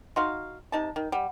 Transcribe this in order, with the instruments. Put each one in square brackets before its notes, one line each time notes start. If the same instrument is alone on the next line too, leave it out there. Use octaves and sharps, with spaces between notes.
[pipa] D#4 F#4 F5 [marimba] C6
[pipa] C3 D#4 A5
D#3
[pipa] G3 [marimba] F#5